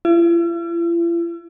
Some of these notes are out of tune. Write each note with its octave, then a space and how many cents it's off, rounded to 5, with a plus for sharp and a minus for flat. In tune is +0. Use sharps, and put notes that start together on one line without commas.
E4 +45